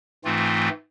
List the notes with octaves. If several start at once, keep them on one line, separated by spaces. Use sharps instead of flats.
G#2 E3 A3 C4 F4